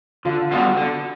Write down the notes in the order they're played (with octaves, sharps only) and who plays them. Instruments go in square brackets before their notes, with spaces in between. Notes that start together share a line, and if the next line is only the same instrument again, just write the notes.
[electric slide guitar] D3 [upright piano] F4
[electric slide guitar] G3 B3 D4 F4 [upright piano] F#4
[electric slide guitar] D3